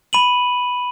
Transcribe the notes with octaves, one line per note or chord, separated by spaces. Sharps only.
B5 D#7 F#7